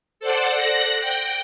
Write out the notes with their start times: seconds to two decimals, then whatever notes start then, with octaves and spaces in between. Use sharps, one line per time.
0.20 A4 C5 D5 F#5
0.56 F#6 A#6
1.01 G5